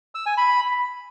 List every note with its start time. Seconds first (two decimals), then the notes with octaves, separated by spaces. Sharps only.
0.15 E6
0.26 G#5
0.37 B5